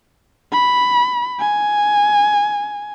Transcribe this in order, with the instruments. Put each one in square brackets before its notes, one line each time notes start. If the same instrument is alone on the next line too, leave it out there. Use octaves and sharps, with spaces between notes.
[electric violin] B5
G#5